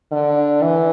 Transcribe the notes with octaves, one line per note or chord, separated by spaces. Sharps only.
D3
E3